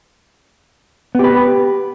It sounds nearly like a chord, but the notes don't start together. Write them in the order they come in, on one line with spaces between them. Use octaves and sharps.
B3 G4 B4